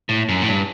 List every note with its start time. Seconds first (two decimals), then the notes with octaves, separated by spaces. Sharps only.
0.09 A2
0.29 F#2
0.41 A2
0.48 G2